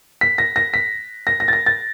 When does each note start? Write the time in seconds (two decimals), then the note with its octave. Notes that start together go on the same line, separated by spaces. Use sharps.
0.21 B6
0.38 A#6
0.56 A#6
0.74 B6
1.27 A#6
1.40 A#6
1.48 A6
1.53 A#6
1.66 A6